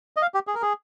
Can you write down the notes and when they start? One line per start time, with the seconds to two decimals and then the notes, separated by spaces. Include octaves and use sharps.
0.16 D#5
0.22 F5
0.34 G4
0.47 G#4
0.55 A#4
0.62 G#4